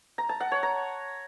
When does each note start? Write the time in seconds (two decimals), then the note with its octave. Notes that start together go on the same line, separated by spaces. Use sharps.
0.18 A#5
0.29 A5
0.40 F#5
0.52 C#5
0.63 A#5